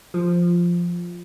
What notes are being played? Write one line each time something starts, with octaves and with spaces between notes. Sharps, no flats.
F3